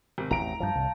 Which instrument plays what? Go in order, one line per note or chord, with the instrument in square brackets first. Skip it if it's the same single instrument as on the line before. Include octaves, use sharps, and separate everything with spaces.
[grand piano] G#1 C3
[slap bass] A1 E2 [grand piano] A#5 D7
[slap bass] G2 F3 [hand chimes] F5 A5 G6
[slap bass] C2